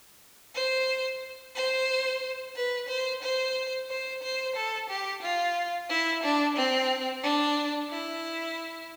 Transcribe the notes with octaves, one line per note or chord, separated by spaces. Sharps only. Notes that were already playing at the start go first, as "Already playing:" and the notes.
C5
C5
B4
C5
C5
C5
C5
A4
G4
F4
E4
D4
C4
D4
E4